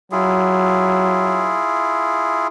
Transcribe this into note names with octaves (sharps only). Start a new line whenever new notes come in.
F#3 E4 F4 G#4